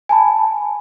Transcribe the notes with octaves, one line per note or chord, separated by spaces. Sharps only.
G#5 A5 B5